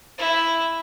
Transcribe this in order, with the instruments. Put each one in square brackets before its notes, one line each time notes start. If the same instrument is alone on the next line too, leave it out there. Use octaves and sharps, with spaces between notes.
[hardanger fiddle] E4